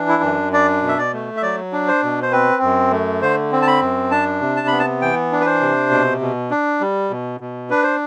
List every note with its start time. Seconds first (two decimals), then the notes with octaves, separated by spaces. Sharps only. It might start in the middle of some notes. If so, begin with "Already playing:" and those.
Already playing: E3 D4
0.08 E4
0.23 F#2
0.53 D4 D5
0.83 B2
0.88 E5
0.98 D5
1.13 A3
1.37 E5
1.42 F#3 D5
1.72 D4
1.88 C5
2.03 B2
2.22 C5
2.32 C4 B4
2.63 F#2
2.92 A3
3.22 D3 C5
3.52 C4
3.62 A5
3.67 B5
3.82 F#2
4.11 D4 A5
4.41 C3
4.56 A5
4.67 B3 B5
4.79 A5
5.02 E3 G5
5.32 D4
5.41 B4
5.46 C5
5.61 C3
5.91 B2
6.21 B2
6.51 D4
6.81 G3
7.10 B2
7.40 B2
7.70 D4 B4
7.83 C5